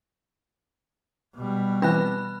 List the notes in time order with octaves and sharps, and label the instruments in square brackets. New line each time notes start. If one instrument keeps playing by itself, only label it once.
[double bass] B2 G3
[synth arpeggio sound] E3 C4 [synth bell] B4 B5 F#6